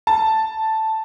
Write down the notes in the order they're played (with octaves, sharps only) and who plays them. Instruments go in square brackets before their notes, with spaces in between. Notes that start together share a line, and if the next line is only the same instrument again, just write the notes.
[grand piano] A5